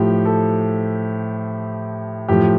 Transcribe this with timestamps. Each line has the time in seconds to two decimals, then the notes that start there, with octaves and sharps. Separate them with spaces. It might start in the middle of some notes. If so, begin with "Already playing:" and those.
Already playing: A2 F3 G4
0.25 A4
2.28 A2 F3 G4